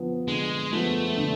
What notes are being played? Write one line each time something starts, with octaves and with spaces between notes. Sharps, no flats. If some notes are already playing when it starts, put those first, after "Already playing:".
Already playing: D3 F3 B3
D3 G#3
F3 A3 B3
D3